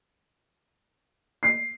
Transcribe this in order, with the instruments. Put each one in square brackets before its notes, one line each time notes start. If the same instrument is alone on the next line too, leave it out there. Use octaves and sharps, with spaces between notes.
[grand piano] C7